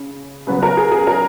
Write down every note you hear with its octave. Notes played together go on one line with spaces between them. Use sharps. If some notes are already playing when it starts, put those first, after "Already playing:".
Already playing: C#3
C#3 F#3 B3 B4
A#4
G#4
G#4
A#4